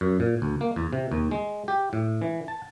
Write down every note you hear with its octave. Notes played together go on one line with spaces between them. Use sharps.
F#2
A#2
D2
A#3
E2
C3
D#2
G#3
G4
A2
E3
A5